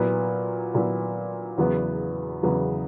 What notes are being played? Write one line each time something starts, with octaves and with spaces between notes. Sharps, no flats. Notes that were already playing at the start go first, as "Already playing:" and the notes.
Already playing: A#2 F#3 B3 E4
A#2 F#3 B3 E4
E2 C#3 F#3 B3
E2 C#3 F#3 B3